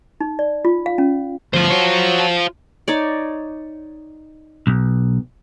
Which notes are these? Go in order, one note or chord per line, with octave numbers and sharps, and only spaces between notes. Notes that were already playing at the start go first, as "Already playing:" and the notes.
D#4
D5
F4
F5
C#4
D2 F3 F4 C5
F#4 C#5
D#4 C#5 D5
B1